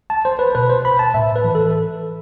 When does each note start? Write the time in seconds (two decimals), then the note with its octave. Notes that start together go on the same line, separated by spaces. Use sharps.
0.10 A5
0.25 C5
0.39 B4
0.55 B2 B4
0.69 C5
0.85 B5
0.99 A5
1.14 A2 E5
1.36 B4
1.44 E3
1.55 A4